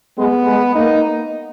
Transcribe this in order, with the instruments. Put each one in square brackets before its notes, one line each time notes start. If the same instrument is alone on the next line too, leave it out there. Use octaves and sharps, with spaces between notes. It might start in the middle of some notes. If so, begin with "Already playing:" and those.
[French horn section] G#3 [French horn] B3
[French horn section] G#3
[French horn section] A#3 [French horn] D#4